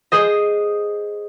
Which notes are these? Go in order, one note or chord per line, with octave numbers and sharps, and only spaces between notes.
G#4 C5 D#5